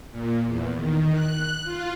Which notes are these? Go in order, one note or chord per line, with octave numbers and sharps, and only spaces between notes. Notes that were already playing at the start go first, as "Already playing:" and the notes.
A#2
E2
D#3
F#6
F4